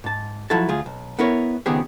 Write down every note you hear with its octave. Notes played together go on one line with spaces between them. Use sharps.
G#2 A5
F3 F#3 E4 F#4 A4 A5
D2 F4 G#4
B1
B3 E4 A#4 C#5
C#2 D#3 B3 C4 G4 G#4